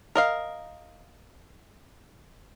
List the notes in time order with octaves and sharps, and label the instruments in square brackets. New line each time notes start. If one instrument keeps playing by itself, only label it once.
[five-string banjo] A#4 D#5 F5